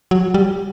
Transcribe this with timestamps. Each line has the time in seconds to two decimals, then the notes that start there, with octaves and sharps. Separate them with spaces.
0.11 F#3
0.34 G3